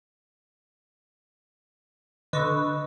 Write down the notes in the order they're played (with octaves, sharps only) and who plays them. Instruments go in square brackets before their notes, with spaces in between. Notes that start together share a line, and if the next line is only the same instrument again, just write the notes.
[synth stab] D3 B4 [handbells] D#5 C#6 E6